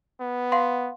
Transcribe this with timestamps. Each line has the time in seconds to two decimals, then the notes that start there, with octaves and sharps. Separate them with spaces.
0.20 B3
0.52 F5 F#5 C6